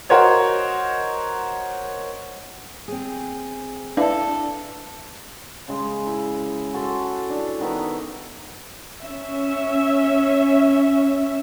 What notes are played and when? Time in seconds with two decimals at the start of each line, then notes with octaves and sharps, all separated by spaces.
0.09 F#4 A#4 C5 C#5 D#5
2.88 C4 G#4
3.97 D4 E4 A4 B4 D5 F5
5.68 C#3 G#3
6.07 E4
6.74 F#4 A4 A5 C6
7.30 D4 E4
7.61 D#3 B3 E5 A#5
9.02 C#4 E5